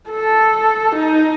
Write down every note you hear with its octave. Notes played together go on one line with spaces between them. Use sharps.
A4
D#4